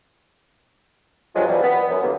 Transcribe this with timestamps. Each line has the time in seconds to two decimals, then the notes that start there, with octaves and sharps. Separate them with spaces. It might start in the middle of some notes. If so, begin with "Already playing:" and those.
1.35 G2 F3 F#3 G#3
1.47 B2 E3 F3 G3
1.63 B3
1.89 F#2
2.02 D3 E3 F#3 G3 A#3 B3